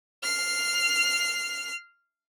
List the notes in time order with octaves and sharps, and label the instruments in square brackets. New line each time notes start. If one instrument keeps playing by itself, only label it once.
[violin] F6 C7